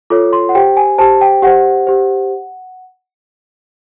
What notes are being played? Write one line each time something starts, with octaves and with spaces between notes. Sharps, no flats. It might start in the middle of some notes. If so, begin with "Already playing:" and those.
F4 A4 C#5 D6
C6
F#5
G4 C5 G5
G#5
G4 C5 A5
G5
G4 C5 F#5
G4 C5